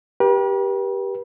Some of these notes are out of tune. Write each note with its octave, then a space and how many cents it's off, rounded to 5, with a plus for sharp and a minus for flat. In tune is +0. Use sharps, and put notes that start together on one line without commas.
G4 +0 B4 -45